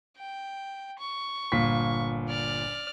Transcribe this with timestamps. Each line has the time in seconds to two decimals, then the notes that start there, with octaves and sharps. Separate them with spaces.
0.17 G5
0.99 C#6
1.52 G1 A#2 B6
2.29 D5 F6